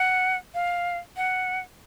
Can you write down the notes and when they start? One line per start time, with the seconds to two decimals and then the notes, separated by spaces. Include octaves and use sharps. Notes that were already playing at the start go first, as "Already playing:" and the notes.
Already playing: F#5
0.54 F5
1.17 F#5